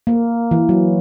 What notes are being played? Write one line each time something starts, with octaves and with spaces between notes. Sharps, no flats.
A#3
E3
F#3